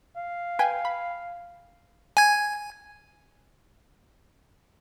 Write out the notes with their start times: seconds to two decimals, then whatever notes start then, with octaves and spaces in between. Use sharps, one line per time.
0.16 F5
0.59 B4 G5 G#5
0.85 B5
2.17 G#5 G#6